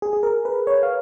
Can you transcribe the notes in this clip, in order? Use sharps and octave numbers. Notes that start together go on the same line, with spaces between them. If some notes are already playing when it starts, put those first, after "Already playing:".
G#4
G#4
A#4
B4
C#5
F5